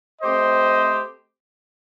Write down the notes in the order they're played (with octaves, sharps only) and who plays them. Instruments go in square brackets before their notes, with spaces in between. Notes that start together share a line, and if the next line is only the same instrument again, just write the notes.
[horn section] A3 C4 G4 C5 D#5